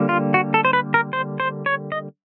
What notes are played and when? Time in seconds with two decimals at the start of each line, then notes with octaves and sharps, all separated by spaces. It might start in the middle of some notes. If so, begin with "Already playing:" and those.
Already playing: D3 G3 A#3
0.09 F4
0.34 F#4
0.54 A4
0.65 C5
0.73 B4
0.94 A#4
1.13 C5
1.40 C5
1.66 C#5
1.92 D#5